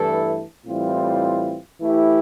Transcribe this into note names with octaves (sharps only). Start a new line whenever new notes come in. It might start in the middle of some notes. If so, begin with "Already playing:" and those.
Already playing: G2 E3 A3 E4 A4
A2 E3 G3 C4 F4
E3 A3 E4 G4